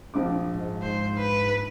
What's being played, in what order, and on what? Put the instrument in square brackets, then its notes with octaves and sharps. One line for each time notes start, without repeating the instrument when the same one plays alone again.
[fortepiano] A#1 C4 D6
[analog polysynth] G#2
[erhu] C5
B4